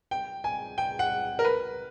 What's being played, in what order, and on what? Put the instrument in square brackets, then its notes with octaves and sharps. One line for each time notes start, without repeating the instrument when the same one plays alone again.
[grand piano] G5
G#5
G5
F#5
A#4
B4